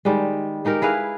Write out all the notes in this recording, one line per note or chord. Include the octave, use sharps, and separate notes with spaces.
D#3 G3 G#3
G#3 D#4 G4 A#4
E4 G#4 B4 F5